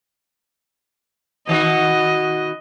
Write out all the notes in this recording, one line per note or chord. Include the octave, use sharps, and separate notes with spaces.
B2 D#3 F#4 D#5